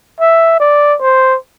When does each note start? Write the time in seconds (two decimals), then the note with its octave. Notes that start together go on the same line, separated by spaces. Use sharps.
0.20 E5
0.60 D5
1.01 C5